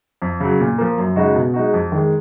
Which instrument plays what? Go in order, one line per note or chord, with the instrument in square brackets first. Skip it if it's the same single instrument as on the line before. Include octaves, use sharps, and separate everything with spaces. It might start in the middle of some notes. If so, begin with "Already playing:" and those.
[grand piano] F2
C#3 F#3
A#2
F3 A#3
F#2
C#3 G#3 D#4 F#4
B2
G#3 D#4 F#4
F2
D#3 G#3